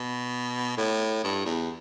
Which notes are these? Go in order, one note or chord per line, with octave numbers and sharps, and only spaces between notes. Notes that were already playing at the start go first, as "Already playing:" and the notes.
Already playing: B2
A2
G2
E2